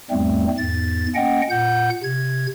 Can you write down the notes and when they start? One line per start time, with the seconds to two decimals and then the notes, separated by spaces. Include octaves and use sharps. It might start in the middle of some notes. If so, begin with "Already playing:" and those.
0.11 E2 G#2 G3 A3 C4
0.57 E2 G#2 A6
1.15 A#3 C#4 D#5 F#5 G5
1.50 A#2 F#5 G6
2.03 C3 G#6